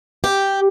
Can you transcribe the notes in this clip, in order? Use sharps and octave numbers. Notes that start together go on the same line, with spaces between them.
G4